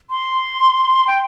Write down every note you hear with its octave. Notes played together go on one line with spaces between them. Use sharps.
C6
G5